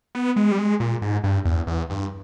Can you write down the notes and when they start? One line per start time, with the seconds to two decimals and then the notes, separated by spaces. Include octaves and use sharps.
0.15 B3
0.36 G#3
0.52 G3
0.59 G#3
0.80 A#2
1.02 G#2
1.24 G2
1.45 E2
1.67 E2
1.90 G2